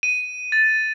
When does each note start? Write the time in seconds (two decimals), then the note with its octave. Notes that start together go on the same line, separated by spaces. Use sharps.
0.03 D#7
0.52 A6